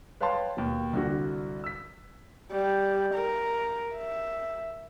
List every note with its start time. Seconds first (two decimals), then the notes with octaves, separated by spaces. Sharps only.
0.21 B4 C#5 F5 G5 A5 C6
0.57 D#2 B2
0.93 C2 D3 F#4
1.64 E6 B6
2.51 G3
3.14 A#4
3.95 E5